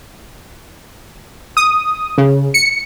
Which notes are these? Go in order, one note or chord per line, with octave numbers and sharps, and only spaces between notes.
D#6
C#3
C#7